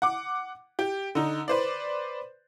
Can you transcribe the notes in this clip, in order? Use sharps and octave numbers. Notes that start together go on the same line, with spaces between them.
F#5 D6
G4
D3 D#4
B4 C5 D5